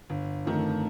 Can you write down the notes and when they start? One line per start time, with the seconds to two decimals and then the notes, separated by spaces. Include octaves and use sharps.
0.10 G1
0.45 F2 D#3 A3